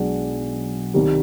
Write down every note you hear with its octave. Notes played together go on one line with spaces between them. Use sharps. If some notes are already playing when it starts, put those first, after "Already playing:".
Already playing: B1 B2 G#3 D4
C2 C3 D#3 G3